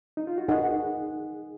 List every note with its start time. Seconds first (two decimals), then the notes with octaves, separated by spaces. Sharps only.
0.17 D#4
0.27 F4
0.38 F#4
0.49 D#4 G#4 A#4 D#5 F#5